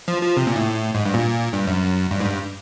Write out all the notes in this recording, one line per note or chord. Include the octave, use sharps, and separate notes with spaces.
F3
F3
C3
A#2
A2
G#2
G2
A#2
G2
F#2
G2
G#2
G2